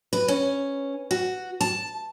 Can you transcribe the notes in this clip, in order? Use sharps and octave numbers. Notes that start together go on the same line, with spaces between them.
B4
C#4
F#4
A5